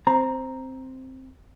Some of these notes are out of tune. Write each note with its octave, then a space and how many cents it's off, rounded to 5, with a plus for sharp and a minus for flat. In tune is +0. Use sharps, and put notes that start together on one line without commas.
C4 +0 A#5 +5